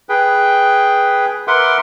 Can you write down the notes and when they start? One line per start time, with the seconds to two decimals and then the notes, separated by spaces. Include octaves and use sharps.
0.09 G#4 B4 G5
1.48 A#4 B4 E5 F#5 C6 D6